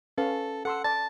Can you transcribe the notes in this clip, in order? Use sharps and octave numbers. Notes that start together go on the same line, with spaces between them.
C#4 A4 B4 F5
A4 F#5 C6 E6
D5 A5